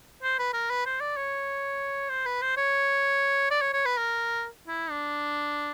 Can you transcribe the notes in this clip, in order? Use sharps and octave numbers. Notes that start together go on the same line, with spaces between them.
C5
B4
A#4
B4
C5
D5
C#5
C5
B4
C5
C#5
D5
C#5
C#5
B4
A#4
E4
D4